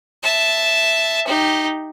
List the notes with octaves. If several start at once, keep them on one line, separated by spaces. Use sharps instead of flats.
E5 A5
D#4 G4